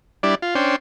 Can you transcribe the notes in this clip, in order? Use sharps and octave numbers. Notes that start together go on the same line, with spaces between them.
G3 D4 E4 D5
F4
C#4 D4 C5 G5